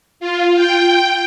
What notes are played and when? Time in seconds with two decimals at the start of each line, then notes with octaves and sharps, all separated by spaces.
0.20 F4
0.55 G5